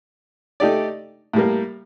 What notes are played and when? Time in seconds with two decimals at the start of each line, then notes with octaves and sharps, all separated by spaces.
0.60 A3 D#4 G4 D5
1.33 A2 G3 A#3